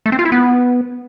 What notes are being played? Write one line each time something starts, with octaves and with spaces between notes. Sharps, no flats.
A3
C4
F4
E4
B3